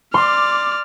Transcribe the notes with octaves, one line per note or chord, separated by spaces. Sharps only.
D5 C6 D6 F6